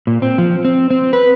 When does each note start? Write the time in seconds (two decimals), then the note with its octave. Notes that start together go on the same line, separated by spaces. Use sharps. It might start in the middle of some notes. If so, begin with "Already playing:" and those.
0.07 A#2
0.22 C4
0.38 F3
0.65 C4
0.90 C4
1.13 B4